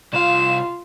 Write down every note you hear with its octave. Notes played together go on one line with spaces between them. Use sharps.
C2 F4 F5 E7